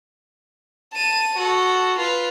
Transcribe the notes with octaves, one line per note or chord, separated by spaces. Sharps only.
A5 D#7
F#4 A4
F4 B4